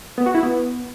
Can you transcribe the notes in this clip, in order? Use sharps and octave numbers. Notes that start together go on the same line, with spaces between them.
B3
F#4
E4
B3